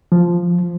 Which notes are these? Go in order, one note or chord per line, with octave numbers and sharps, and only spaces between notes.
F3